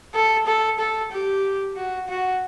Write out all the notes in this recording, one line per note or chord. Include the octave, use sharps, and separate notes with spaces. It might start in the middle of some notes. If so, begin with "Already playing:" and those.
A4
A4
A4
G4
F#4
F#4